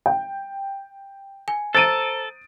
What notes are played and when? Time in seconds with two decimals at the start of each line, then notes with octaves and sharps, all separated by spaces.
0.06 G5
1.48 G#5
1.75 A4 C5 A#5 A6 D7 D#7